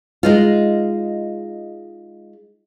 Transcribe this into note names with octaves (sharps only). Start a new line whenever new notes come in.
G#3 D#4 F4